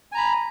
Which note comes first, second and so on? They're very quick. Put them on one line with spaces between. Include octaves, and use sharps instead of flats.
G#5 A#5 B5